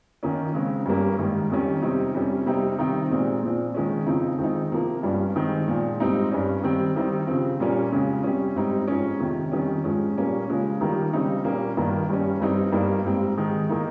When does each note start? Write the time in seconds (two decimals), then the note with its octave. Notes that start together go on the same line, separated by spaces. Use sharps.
0.23 D#3 A#3 C#4
0.54 C#3 G#3 C4
0.86 G2 G3 A#3 C#4
1.18 G#2 D#3 G3
1.50 F2 D#3 G3 C#4
1.82 C3 G3 C4 D#4
2.14 F2 C3 G3 C#4
2.46 C3 G3 C4 D#4
2.79 C3 D#3 G3 C4 D#4
3.11 A#2 G#3 C4
3.43 A#2 F3 C4
3.74 D#3 G#3 C#4
4.06 F2 C#3 F3 C4 D#4
4.39 D#3 G#3 C4 D#4
4.71 C3 F3 A#3
5.03 G2 G3 C#4
5.35 D#3 G#3 C4 D#4
5.68 A#2 F3 G#3
6.00 G#2 G3 C4 D#4
6.32 G2 G3 C#4
6.64 D#3 G3 C4
6.96 D#3 G3 C4 D#4
7.27 C#3 F3 C4
7.60 A#2 G3 A#3 C#4
7.92 F2 C#3 G#3 C#4
8.24 C3 G3 C#4
8.55 G#2 G3 C4 D#4
8.88 G#2 F3 G#3 C#4
9.20 F2 C3 D#3
9.52 F2 D#3 G3 C#4
9.84 G#2 F3 G#3 C#4
10.17 A#2 G3 A#3 C#4
10.48 C#3 F3 G#3 C#4
10.81 D#3 G3 A#3 D#4
11.13 C#3 G3 C4 D#4
11.44 A#2 G3 A#3 C#4
11.77 G2 D#3 A#3
12.09 G2 G3 C#4
12.40 G2 G3 C4 D#4
12.72 G2 G3 A#3 D#4
13.04 G#2 G3 C4
13.37 G#2 D#3 G#3 D#4
13.69 D#3 A#3 D#4